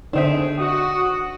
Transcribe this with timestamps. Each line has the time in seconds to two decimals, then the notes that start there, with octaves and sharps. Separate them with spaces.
0.13 B2 D3 C4 D4 D#4 G#4 C5 E5
0.58 F#4 D#6